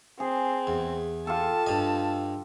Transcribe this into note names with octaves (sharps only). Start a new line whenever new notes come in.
C4 G#4
E2
F4 G4 A4 A5
G2 D#5